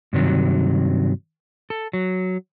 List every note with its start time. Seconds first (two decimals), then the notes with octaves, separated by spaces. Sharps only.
0.13 G2 C3 D#3 F#3
1.70 A4
1.93 F#3